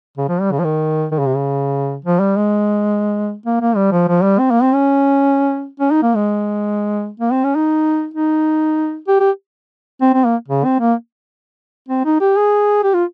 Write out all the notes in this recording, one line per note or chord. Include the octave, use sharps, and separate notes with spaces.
C#3
F3
G3
C#3
F3
D#3
D#3
C#3
C3
C#3
F3
G3
G#3
A#3
A#3
G3
F3
F3
G3
C4
A#3
C4
C#4
C#4
D#4
A#3
G#3
A#3
C4
C#4
D#4
D#4
G4
G4
C4
C4
A#3
C#3
C4
A#3
C4
D#4
G4
G#4
G4
F4